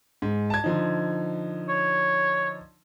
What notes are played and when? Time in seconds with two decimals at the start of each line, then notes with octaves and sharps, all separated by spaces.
0.22 G#2
0.50 A5 G#6
0.64 D3 F3 D#4
1.69 C#5